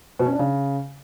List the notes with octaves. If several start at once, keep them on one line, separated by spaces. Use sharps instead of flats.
B2
C#4
D4
C#3